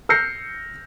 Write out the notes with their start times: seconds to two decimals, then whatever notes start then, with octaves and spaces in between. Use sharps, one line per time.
0.09 E6 F6 G6 A#6 C7 C#7